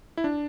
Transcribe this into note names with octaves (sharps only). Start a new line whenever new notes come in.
E4
D4